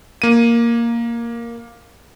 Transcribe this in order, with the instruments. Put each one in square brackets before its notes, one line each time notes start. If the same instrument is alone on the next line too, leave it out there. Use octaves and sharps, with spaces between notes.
[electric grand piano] A#3 D#7